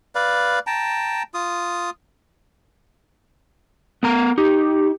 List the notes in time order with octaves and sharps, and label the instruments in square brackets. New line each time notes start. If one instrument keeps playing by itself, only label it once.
[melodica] B4 D5 F5
G5 A5 A#5
F4 D#6
[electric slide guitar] B3 A#4 A#5
[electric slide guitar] D#4 [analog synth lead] G4